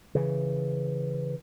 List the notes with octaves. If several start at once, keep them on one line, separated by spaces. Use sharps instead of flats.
C#3 E3